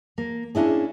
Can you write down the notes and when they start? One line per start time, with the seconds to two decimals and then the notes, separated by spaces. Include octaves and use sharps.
0.18 A#3
0.55 A#3 C#4 D4 E4 G#4